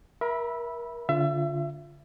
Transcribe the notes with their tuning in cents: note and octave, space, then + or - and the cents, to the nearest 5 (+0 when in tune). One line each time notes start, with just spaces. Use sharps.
A#4 +30 E5 +0 B5 -15
D3 -30 F4 +0 E5 +30